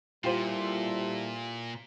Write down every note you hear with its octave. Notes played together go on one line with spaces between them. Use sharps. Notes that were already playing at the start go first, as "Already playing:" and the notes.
A#2 G3 E4 F4 G4 A4 C5